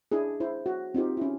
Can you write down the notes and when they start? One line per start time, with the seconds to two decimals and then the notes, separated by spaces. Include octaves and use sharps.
0.12 D4 E4 G#4
0.40 E4 C5
0.66 F#4
0.94 C4 D#4 F4 G4
1.17 C#4 E4